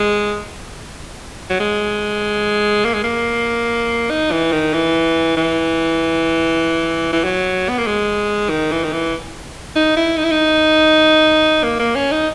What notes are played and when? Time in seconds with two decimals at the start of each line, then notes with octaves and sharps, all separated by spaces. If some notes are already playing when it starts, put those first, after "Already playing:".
Already playing: G#3
1.50 F#3
1.60 G#3
2.85 A#3
2.94 G#3
3.04 A#3
4.10 D#4
4.31 E3
4.52 D#3
4.74 E3
5.37 E3
7.13 E3
7.24 F#3
7.69 B3
7.78 A#3
7.87 G#3
8.50 D#3
8.72 E3
8.84 D#3
8.93 E3
9.76 D#4
9.97 E4
10.18 D#4
10.24 E4
10.32 D#4
11.64 A#3
11.79 A#3
11.95 C#4
12.12 D#4